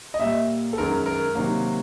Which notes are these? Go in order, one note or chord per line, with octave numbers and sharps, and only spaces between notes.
D#5
A#2 G3 A#3 E5
A4
F#2 D#3 G#3 A#4
A#4
C3 D#3 F#3 A#3